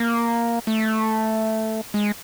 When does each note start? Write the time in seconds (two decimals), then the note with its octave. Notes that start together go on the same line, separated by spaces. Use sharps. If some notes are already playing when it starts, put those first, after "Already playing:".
Already playing: A#3
0.67 A3
1.94 G#3